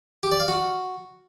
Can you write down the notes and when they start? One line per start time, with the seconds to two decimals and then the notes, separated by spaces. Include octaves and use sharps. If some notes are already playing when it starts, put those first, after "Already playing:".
0.23 G4
0.32 D5
0.40 F5
0.48 F#4